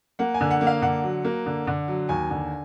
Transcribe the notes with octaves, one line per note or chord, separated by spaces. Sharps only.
A#3 F#5
G#5
D3
F#5
A#3
F5
D3 F#5
F#3
A#3
D3
D3
F#3
D#2 G#5
D3